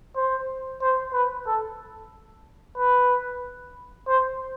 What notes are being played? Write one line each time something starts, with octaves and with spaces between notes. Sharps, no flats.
C5
C5
B4
A4
B4
C5